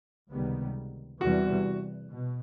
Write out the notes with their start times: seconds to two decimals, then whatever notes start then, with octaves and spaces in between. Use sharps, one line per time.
0.30 C#2 C3 D#3 G3 B3
1.21 E2 C3 E3 G3 F#4
2.11 B2